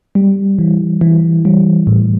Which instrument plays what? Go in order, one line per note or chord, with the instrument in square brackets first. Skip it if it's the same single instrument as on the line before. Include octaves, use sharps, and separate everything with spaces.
[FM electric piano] G3
E3
E3
G3
A2